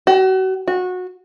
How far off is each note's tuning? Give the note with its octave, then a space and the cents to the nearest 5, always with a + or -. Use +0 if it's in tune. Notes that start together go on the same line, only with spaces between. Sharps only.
F#4 +35
F#4 -20